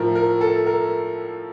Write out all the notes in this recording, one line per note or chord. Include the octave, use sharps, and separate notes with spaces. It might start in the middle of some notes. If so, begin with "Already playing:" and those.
Already playing: A2 F3 A#4
A#4
A4
A#4